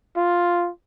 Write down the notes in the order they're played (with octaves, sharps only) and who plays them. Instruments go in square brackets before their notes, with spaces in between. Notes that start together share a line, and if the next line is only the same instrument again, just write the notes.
[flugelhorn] F4